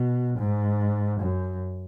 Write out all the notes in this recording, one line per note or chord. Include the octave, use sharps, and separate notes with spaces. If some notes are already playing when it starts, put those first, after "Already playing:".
Already playing: B2
G#2
F#2